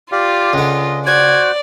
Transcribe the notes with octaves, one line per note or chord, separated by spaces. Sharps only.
F4 G4 D5 F5
C#2 D3 D#5
F#4 C5 D5 G#6